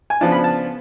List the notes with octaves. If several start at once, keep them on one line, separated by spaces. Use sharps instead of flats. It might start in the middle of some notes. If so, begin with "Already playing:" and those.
G#5
C#3 F3 B3 D4 F4 A5
B5
A5